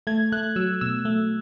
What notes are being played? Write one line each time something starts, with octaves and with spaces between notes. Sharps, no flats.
A3 G#6
A3 F#6
F#3 E6
B2 E6
A3